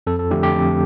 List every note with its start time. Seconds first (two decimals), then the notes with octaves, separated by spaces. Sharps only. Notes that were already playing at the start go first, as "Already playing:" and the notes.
0.07 F2 A4
0.19 A4
0.31 D3 F3 A3 D4 G4
0.43 G4
0.55 F2